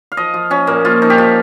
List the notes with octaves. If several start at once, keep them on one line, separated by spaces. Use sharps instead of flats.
F5
F3 D#5
F3
F3 C#4
A#2 A#3
F3 F4
F3 D#4
G4
F3 F4